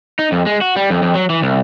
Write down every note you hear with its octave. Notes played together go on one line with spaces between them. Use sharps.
D#4
F2
G#3
F#4
G3
F2
F2
F#3
E3
C2